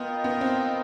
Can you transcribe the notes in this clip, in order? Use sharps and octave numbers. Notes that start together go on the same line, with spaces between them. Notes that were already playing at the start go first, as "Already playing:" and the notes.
Already playing: B3 F4 A#4 D#5 G5
B3
C4